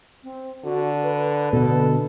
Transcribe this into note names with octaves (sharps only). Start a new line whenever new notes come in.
C4
D3 F#4
B4
B2 D3 A4